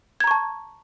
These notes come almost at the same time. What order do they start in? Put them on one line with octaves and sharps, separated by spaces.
G#6 A#5 C#6 A5